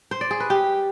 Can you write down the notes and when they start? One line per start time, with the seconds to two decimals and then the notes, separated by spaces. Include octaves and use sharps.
0.11 C5
0.21 D5
0.31 G#4
0.40 B4
0.50 G4